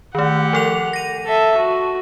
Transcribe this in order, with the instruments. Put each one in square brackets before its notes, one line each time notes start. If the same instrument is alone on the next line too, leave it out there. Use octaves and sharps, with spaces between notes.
[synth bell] D#3 A3 [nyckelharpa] G4 F#5
[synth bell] F3 A4 F7
A#6 D#7
[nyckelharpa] A4 E5
F#4